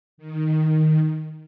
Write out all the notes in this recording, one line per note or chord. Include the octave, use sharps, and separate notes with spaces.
D#3